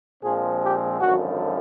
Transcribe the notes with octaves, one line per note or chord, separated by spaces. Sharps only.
A#1 A#2 F3 G#3 C4 G#4
G4
G#1 F#2 D3 F3 F#4